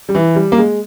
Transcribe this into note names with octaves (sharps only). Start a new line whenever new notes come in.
G3
E3
G3
A#3
G#3